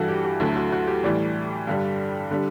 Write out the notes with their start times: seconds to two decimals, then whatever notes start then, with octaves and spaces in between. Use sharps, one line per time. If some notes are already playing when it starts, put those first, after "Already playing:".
Already playing: G2 E3 G3 F#4 A4
0.08 G4
0.25 F#4
0.40 D2 D3 F#3 A3 E4
0.56 F#4
0.72 F#4
0.87 G4
1.04 A2 E3 G3 D5
1.67 G2 D3 G3
2.31 D3 G3